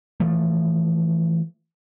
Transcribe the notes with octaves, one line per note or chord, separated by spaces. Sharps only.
E3 F3 A3